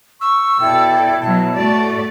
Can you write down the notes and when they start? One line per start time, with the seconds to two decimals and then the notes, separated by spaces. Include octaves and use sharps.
0.21 C#6 E6
0.61 B2 E4 A4 D5 G5
1.22 B2 F#3 A5
1.55 A2 A3 F#4 D5